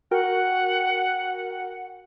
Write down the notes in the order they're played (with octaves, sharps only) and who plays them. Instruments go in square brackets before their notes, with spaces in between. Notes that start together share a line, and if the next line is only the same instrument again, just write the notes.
[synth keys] F#4 A#4 G5 [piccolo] F#5